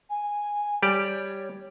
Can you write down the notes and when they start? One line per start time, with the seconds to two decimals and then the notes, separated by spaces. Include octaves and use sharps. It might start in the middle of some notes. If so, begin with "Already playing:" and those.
0.10 G#5
0.82 G3 G4 C#5 D5